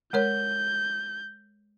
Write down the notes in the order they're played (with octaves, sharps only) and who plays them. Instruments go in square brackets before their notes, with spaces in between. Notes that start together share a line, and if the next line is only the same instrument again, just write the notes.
[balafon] G#3 A#4 C#5 [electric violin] G6